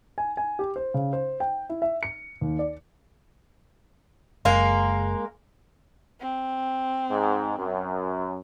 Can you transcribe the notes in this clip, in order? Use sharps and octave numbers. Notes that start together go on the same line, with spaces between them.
G#5
G#5
G4
C5
C#3
C5
G5
E4
E5
C#7
D#2
D5
F#1 G#3 A#3 F5
C4
G#2
F#2